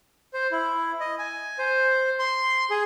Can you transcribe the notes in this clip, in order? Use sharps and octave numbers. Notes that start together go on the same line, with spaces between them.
C5
E4
D#5
G#5
C5
C6
G#4